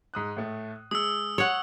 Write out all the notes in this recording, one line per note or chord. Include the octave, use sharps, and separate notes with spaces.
G#2 D#6 F#6
A2 A3
G#3 D#6 E6
C#5 F#5